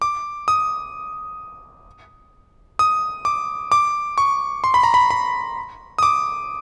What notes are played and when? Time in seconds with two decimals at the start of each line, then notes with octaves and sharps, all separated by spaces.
0.02 D6
0.48 D#6
2.79 D#6
3.25 D6
3.72 D6
4.18 C#6
4.64 C6
4.74 B5
4.83 A#5
4.94 B5
5.11 B5
5.98 D#6
6.03 D6